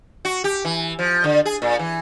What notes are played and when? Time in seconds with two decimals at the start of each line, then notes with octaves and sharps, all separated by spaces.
0.25 F#4
0.44 G4
0.65 E3
0.99 F3
1.24 D3
1.45 G#4
1.62 A#2
1.79 E3